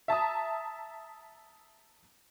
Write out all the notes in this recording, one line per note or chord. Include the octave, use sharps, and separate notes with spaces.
E5 A5 A#5 D#6